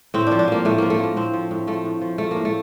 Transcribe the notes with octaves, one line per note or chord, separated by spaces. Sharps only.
A2 C4
F3 D4
D4
F3 A#3
A2 A3
F3 A#3
A3
F3 A#3
A2 C4
F3
A2
F3 A3
A2
F3
F3 A3
A#3
A2
A3